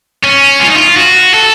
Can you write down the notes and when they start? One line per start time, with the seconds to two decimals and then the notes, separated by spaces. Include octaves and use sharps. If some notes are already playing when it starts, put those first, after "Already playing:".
0.24 C#4
0.61 F4
0.68 D#4
0.76 F4
0.97 F#4
1.34 A4